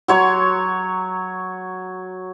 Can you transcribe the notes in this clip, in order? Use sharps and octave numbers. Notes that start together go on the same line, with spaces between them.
F#3 C#5 C6